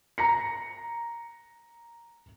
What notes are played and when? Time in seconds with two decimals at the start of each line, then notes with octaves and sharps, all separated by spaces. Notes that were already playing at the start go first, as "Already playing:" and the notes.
0.18 A#5 A#6 C#7